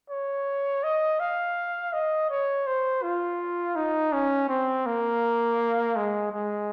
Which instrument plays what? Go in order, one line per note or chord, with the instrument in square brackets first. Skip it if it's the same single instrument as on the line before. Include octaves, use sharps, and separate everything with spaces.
[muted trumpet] C#5
D#5
F5
D#5
C#5
C5
F4
D#4
C#4
C4
A#3
G#3
G#3